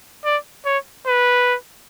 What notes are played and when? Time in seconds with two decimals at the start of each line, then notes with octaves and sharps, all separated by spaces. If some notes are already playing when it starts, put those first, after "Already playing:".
0.25 D5
0.66 C#5
1.07 B4